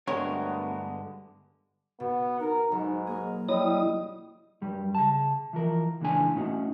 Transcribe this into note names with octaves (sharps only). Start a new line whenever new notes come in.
G2 D3 G#3 A3 B3 F#4 A#4 C#5
B2 B3
D#4 A#4
B1 G#2
A#3 G#4 A#4
F#3 G3 E4 D#5 D#6
F#2 G3
C#3 A5
E3 F3 A#4
C#2 A#2 E3 F3 D4 G#5
A2 C#4 D#4 F#4